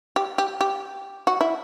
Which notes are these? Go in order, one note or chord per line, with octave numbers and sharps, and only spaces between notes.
G4
G4
G4
F#4
E4